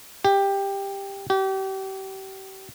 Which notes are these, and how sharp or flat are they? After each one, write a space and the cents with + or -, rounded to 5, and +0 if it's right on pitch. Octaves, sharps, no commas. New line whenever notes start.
G4 +10
G4 -35